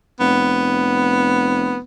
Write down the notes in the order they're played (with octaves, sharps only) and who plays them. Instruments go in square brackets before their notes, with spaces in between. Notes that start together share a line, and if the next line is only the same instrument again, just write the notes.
[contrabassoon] F1 [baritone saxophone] B3